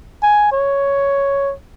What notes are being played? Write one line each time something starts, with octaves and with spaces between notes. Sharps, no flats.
G#5
C#5